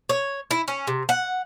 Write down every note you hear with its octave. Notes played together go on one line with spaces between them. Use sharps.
C#5
E4
C#4
C3
F#5